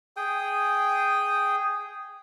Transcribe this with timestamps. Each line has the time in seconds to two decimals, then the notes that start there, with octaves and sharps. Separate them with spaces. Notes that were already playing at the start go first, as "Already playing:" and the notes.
0.16 G#4 G5 D#6